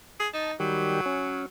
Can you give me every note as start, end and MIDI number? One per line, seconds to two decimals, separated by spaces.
0.19 0.28 68
0.34 0.53 63
0.34 0.52 81
0.60 1.01 51
0.60 1.43 54
0.60 1.01 55
0.60 1.01 67
1.06 1.46 61